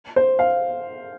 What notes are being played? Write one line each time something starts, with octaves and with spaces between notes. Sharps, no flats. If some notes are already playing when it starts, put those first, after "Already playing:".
C5
F5